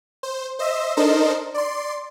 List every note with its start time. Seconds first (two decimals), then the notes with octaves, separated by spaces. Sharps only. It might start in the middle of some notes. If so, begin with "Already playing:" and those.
0.23 C5
0.59 C5 D#5 E5 E6
0.97 D4 D#4 A4 A#4 C5 D#5
1.54 D5 C6